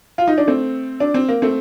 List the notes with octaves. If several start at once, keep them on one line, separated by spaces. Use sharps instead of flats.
F4
D#4
D4
A3 C4
D4
C4
A#3
A3 C4